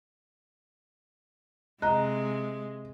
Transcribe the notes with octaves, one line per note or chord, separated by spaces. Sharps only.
C3 G#3 D#5 A#5 F#6